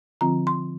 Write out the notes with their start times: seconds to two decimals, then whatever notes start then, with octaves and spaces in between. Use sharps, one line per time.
0.21 D3 F3 C4 F4 A#5
0.47 C6